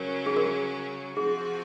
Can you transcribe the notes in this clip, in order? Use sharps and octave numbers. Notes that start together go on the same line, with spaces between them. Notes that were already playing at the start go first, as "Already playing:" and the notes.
Already playing: C#3 F#3 C#4 A#4 C#5
G#4
A#4
C3 F3 C4 F#4 G#4